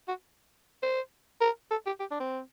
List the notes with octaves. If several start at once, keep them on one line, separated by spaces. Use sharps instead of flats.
F#4
C5
A#4
A4
G4
G4
D4
C4